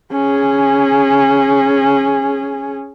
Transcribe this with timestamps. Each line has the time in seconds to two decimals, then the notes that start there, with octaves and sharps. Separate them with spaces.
0.12 C#4 G#4